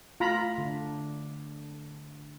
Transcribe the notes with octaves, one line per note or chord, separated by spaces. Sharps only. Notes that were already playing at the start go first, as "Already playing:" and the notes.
A3 F4 A#5 B5
D3 D4